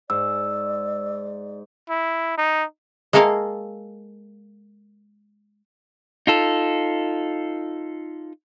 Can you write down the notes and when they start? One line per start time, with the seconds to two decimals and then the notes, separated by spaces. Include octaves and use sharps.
0.10 G#2 D5 E6
1.90 E4
2.37 D#4
3.13 G#3 A#3 A4 A#4 F5
6.27 D#4 F4 A4